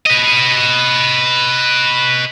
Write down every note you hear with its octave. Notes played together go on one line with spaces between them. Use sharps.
B4 D#5